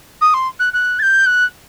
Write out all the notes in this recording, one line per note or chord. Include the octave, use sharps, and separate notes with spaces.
D#6
C6
F#6
F#6
A6
G6
F#6